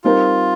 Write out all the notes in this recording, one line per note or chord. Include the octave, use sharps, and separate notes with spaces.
G3 C4 D#4 F4 A#4